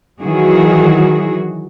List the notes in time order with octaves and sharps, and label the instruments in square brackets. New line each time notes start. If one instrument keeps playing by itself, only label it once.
[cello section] D#3 E3 F#3 F#4 G#4